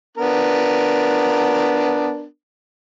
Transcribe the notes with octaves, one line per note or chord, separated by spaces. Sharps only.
B3 D4 A#4